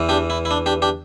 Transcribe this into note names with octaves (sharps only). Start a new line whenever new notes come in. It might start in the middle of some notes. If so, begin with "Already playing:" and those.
Already playing: E2 E3
D4 G4
E4
E4
D4
D4 G4
D4 G4